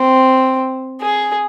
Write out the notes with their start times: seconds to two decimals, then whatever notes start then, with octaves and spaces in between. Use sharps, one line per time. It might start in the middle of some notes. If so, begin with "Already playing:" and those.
Already playing: C4
1.01 G#4